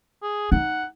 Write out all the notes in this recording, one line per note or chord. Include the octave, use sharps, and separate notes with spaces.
G#4
D#4 F#5